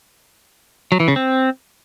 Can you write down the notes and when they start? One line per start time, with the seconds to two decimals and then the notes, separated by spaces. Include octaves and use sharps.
0.92 F#3
1.00 E3
1.08 C#3
1.16 C4